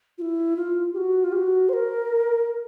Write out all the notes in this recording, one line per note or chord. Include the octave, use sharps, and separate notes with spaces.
F4
E4
F4
G4
F#4
F4
G4
F#4
C5
A#4